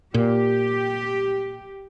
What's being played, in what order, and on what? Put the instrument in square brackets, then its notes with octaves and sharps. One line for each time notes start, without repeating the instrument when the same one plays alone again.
[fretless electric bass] A#2 [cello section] G4